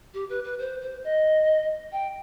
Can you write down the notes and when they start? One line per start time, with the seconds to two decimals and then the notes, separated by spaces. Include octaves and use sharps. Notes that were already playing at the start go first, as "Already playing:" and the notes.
0.13 G4
0.29 B4
0.43 B4
0.58 C5
0.81 C5
1.03 D#5
1.92 G5